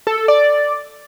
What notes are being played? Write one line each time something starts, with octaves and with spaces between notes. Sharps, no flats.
A4
A4
D5